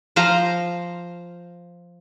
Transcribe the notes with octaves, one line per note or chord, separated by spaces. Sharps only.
F3 C5 F5 A#5